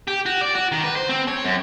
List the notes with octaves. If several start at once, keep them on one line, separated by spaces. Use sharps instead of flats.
G4
F#4
D5
F#4
D#3
B4
C5
C4
C#5
F#2